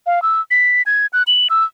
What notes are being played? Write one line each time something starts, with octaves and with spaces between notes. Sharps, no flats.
F5
E6
B6
G#6
F#6
F#7
E6